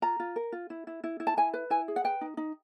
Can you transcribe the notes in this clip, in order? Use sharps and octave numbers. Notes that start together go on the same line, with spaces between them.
F4 A#5
F4
A#4
F4
E4
E4
E4
E4
A5
E4 G#5
B4
E4 G#5
G#4
F#5
B4 G5
D#4
D#4